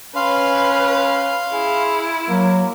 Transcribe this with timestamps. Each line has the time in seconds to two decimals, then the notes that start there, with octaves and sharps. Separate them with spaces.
0.16 C#4 B4 F5 C6
1.52 E4 G#4
2.29 F#3 A#3